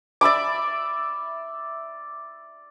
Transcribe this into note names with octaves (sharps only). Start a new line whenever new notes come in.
D5 E5 B5 D6